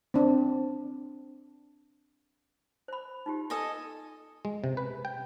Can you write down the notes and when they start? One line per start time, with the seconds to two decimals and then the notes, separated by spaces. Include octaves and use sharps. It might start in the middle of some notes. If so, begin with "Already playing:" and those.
0.14 C4 D4
2.88 C5 B5
3.26 D#4 F4 G4
3.50 A4 D#5 G#5
4.45 G#3
4.64 C3
4.77 B4
5.05 G5